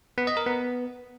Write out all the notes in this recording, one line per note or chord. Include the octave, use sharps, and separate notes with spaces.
B3
D#5
A#4
B3